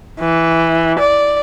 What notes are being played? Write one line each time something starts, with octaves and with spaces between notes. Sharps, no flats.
E3
D5